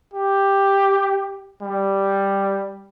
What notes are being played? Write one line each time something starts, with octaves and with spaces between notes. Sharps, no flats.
G4
G3